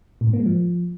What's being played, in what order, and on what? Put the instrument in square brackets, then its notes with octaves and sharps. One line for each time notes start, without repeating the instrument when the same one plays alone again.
[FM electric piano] A2
G#2
A#3
G#3
F3